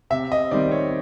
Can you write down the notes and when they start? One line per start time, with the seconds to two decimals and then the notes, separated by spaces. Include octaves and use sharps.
0.10 C3 E5
0.32 D#5
0.51 D#3 G3 C4 D5
0.71 C#5